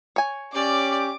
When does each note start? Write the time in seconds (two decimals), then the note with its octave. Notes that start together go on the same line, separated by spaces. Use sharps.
0.16 C#5 G#5
0.55 C#4 G4 D5 D6